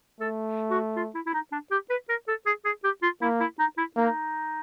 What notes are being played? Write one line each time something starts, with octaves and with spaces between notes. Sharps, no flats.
A3 A4
F#4
F4
E4
E4
D#4
D4
G4
B4
A#4
A4
G#4
G#4
G4
F4
A#3 E4
E4
D#4
E4
A#3 D#4